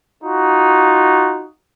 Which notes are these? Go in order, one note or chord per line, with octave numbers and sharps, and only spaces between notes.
D#4 F4 F#4